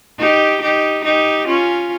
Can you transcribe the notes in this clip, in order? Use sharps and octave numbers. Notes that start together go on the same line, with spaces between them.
D#4 G4
D#4 G4
D#4 G4
C#4 F4